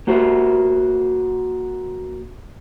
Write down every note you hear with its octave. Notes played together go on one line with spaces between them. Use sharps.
A#3 F#4 C5